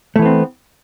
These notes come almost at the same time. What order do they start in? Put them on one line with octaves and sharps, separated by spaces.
A3 E3 B3 C4